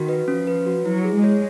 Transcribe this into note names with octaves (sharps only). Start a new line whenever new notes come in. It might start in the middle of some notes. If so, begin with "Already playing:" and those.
Already playing: D#3 F#4
B4
F3 C#4
B4
F#4
F#3 E4
G#4
G#3
C#5